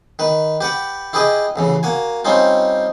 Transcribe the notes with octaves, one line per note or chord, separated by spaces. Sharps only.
D#3 B4
G4 B4 F#5
E4 G4 G#4 B4 D#5
A1 C#3 E3
A#3 F#4 G#5
G3 C4 C#4 D#4 F4